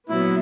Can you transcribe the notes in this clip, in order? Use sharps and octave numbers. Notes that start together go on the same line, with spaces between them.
A#2 F#3 B3 E4